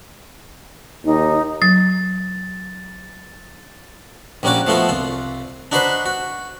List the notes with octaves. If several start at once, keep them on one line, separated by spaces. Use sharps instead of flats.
D#2 D#4
F#3 A6
A#1 G3 A#3 C#4 F#4 D6
F3 A3 B3 F4 F#4
C2 F4
D4 D#4 F#4 B4 C5 B5
F#4